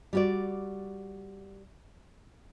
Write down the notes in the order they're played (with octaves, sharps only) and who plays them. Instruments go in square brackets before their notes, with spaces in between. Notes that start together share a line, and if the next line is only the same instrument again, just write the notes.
[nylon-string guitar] G3 F#4 D5